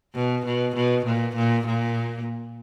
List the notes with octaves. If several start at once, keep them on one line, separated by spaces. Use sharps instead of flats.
B2
B2
B2
A#2
A#2
A#2